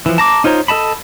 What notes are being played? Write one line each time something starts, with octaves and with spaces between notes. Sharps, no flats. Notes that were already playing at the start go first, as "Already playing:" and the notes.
E3 F3
A5 A#5 D6
D#4 F4 C5 C#5 A#5
A4 D#5 A5 B5